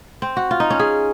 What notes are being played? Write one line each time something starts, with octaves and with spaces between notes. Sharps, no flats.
C4
F#4
F4
D#4
C#4
G#4